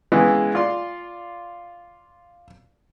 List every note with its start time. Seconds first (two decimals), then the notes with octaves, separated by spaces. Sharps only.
0.12 C#3 E3 G#3 B3
0.55 F4 D5 C6